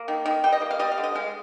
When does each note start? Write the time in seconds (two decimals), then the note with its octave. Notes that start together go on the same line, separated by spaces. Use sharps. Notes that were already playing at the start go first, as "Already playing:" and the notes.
Already playing: A#3
0.08 D#3
0.26 D#3
0.44 G3 G5
0.52 D#5
0.62 A#3
0.71 F5
0.79 G3 D#5
0.92 F5
0.98 D3
1.03 D#5
1.15 G#3 F5